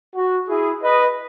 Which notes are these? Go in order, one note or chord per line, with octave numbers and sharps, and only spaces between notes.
F#4
E4 G#4
B4 D#5